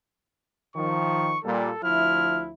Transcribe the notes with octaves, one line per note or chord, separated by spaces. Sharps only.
D#3 F3 C#6
A#2 G3 A4
D2 F3 E4 F6